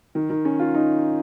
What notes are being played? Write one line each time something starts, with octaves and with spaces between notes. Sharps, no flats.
D#3
D#3
C#4
F4
D#4